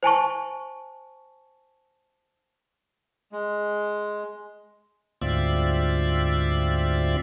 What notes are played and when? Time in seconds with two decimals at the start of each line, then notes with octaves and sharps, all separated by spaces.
0.03 C5 G#5 A5 C#6
3.32 G#3
5.22 D2 G#2 C4 F4 D5 E5